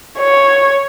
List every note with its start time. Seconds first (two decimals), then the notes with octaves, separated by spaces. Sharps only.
0.18 C#5